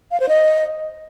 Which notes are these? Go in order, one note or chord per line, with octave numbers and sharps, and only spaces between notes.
F5
C5
D#5